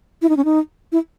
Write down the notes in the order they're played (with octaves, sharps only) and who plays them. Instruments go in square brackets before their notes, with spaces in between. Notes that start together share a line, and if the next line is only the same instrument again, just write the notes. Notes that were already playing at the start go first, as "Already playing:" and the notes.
[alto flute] E4
D#4
C#4
D#4
E4